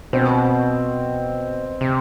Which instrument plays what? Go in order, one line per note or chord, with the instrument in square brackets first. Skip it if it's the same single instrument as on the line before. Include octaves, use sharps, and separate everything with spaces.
[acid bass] B2 [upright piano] C4
[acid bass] C3